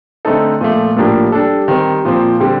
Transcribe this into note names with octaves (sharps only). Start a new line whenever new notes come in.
D3 A3 C4 D#4 A4
A#2 F3 A3
A2 F3 A#3 D4 G4
G3 D4 A4
D#3 G3 C4
A#2 F3 C4
D3 G3 C4 G4